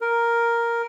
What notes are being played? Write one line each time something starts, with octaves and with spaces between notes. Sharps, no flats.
A#4